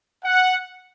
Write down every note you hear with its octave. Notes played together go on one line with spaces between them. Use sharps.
F#5